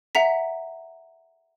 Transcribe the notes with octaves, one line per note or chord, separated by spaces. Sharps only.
E5 F#5 A#5 B6